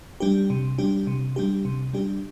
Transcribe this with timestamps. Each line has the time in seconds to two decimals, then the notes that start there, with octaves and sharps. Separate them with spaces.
0.20 G3 D4 G4
0.50 C3
0.78 G3 D4 G4
1.07 C3
1.36 G3 D4 G4
1.65 C3
1.93 G3 D4 G4